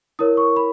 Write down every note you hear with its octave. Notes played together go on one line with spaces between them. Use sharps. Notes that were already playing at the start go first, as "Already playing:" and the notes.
E4 A#4 C#5 D#6
C#6
B5